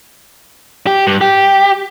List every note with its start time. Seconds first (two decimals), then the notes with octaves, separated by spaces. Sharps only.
0.87 G4
1.07 G2
1.21 G4